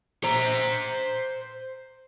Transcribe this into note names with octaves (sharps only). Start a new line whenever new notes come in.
C5 A#5